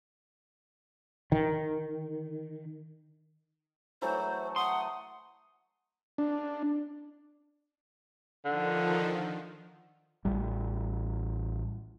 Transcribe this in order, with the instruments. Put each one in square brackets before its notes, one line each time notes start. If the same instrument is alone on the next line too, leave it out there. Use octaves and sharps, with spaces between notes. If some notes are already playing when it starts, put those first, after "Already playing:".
[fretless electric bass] D#3
[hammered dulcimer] E3 F#3 A3 [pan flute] C5
[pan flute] F#5 [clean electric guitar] C6 [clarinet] D#6
[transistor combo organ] D4
[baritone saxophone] D3 [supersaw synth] D#3 F3
[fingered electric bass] A1 G3